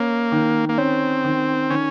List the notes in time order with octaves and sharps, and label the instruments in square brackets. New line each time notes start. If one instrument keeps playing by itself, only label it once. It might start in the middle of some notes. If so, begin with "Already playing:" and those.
Already playing: [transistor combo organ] A#3 [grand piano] C#4
[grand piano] D#3
[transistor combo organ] A#3
[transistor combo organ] C4 [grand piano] C#4
[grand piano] D#3
[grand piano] D#3 [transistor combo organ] C#4